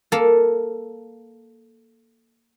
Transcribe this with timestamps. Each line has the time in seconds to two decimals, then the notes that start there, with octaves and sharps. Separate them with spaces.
0.12 A#3 A4 A5